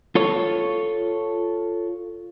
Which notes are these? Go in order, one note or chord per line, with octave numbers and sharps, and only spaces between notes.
F4 A4 C#5